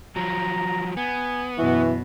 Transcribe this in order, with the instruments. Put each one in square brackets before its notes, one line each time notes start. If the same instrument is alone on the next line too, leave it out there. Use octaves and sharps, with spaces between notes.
[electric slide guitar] F3 F#3 [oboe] A#5
[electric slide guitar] B3 [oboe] G#5
[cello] F#2 B2 [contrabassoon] E3 [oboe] F#4